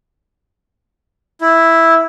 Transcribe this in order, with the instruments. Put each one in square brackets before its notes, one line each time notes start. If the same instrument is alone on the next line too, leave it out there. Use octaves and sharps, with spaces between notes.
[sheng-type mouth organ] E4